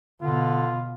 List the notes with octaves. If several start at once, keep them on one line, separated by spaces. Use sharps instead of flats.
B2 D3 F4